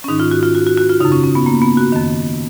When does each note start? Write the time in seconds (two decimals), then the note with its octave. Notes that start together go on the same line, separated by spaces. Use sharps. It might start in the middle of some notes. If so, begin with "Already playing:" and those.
0.04 C#4
0.08 G#2 D#3 D#4
0.20 F4
0.31 F#4
0.43 F4
0.55 F#4
0.67 F#4
0.77 F#4
0.89 F4
1.00 F#2 C#3 D#4
1.12 C#4
1.24 C#4
1.35 B3
1.46 A#3
1.62 B3
1.77 F#4
1.92 F#2 D#3